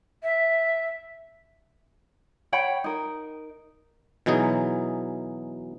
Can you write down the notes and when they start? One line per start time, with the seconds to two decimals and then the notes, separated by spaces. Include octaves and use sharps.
0.23 E5
2.52 C#5 F#5 G5 B5
2.84 D#4 A#4
4.26 B2 E3 F#3 D#4 G#4